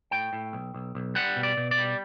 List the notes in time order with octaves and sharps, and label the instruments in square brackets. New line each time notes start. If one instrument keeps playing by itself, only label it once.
[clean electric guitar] A2 G5
A2
B1
B1
B1
G3 F#5
B2
D5
B2
D5
G3